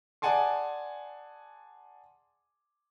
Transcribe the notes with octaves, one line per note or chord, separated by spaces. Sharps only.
G#4 D5 F#5 G#5 A5 C6